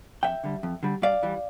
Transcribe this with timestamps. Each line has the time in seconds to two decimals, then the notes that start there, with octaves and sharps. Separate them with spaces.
0.23 F2 E5 G5
0.44 D3 G3
0.63 F2
0.83 D3 G3
1.02 G2 D5 F5
1.23 E3 G3